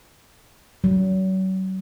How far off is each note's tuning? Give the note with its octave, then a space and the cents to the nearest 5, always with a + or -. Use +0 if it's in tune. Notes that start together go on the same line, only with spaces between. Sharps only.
F#3 +35